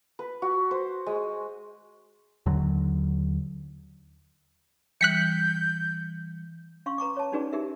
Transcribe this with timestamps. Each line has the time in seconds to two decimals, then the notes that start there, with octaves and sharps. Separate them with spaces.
0.19 B4
0.42 F#4
0.71 C5
1.06 G#3
2.46 D#2 D3 F#3
5.01 E3 G3 F#6 G6 B6 C#7
6.86 C#4 F5 C6 C#6
6.98 B4 A#5 C#6 D6
7.17 C#5 A5
7.32 C#4 D#4 F#4 G#4 B4 D5
7.53 D#4 G4 G#4 A#4 E5